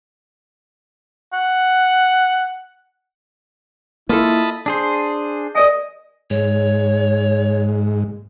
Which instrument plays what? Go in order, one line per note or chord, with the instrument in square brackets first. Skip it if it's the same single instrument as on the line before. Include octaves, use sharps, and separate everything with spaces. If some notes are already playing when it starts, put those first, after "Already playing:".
[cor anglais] F#5
[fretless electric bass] A#3 [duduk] E4 [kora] F4 A4 [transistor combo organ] D#5 A5 B5
[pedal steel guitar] D4 G#4 C5
[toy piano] A#4 D5 G#5 [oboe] D#5
[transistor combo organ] G#2 [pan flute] C#5